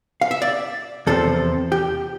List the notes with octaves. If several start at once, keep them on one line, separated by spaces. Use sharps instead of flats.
F5
E5
D5
E2 C3 F3 C4 A4
G4